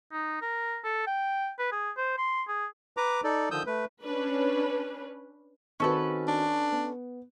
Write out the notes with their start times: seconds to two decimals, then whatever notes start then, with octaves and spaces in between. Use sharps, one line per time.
0.12 D#4
0.42 A#4
0.84 A4
1.07 G5
1.59 B4
1.72 G#4
1.97 C5
2.18 C6
2.48 G#4
2.97 B4 A#5 D6
3.24 D#4 A4 D5
3.51 D3 D#3 F3 D#6 E6 G6
3.66 A3 B4
4.03 C#4 D4 B4
5.80 D#3 C4 C#4 F#4 A4 B4
6.28 D4
6.72 B3